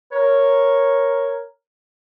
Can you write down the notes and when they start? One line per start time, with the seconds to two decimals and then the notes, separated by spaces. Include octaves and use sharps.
0.12 A#4 C#5